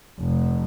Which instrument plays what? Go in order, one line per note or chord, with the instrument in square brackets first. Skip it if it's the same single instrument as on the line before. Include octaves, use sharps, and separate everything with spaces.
[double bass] F1